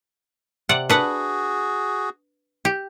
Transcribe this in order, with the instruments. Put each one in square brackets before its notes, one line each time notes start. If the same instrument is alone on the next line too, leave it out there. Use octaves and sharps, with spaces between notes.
[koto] C3 D5 F#5
[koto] D4 B4 F#5 [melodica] F#4 G#4
[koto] G4